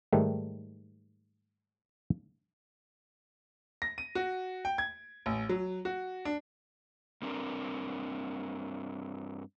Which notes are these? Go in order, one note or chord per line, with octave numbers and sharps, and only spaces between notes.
G#2 D#3 G3 A3
A#6
D#7
F#4
G5
G#6
A1
F#3
F#4
D4
G2 C4 D4 A#4